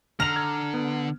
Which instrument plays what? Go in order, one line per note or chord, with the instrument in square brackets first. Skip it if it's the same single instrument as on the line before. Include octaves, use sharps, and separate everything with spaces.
[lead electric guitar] D3 [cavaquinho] A#5 [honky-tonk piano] F6 F7
[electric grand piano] G#6
B3